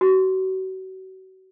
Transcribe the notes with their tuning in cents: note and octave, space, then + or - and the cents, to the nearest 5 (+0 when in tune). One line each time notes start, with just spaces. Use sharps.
F#4 +35